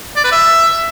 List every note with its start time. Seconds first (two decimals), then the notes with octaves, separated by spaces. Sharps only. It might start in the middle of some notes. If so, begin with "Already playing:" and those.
0.16 D5
0.24 B4
0.32 E5